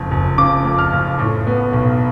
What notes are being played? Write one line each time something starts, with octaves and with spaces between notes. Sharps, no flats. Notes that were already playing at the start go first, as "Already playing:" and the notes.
Already playing: F#1 F2
F#1
C#3 D6
F2
F6
F#1
A2
B3
B1